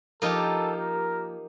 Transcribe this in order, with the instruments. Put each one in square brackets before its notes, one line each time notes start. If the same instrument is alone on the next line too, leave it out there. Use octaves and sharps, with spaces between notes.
[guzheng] F3 A#3 D#4 G4 [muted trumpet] A4
[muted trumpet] A#4